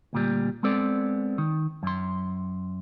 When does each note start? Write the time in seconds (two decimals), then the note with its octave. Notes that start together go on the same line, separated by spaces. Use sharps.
0.13 D2 A#2 G3
0.63 G#3 B3 C4 A4 D5
1.38 D#3
1.83 F#2 C6